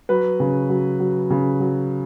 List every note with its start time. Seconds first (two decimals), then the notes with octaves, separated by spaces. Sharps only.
0.09 F#3 B4
0.40 C#3
0.69 F#3
1.00 F#3
1.30 C#3
1.60 F#3